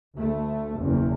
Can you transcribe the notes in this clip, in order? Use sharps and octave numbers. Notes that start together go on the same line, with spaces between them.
D2 A3
F#1 E2 B2